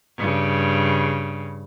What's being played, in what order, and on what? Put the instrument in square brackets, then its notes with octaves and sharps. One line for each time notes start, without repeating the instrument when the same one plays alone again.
[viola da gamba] G2 C#3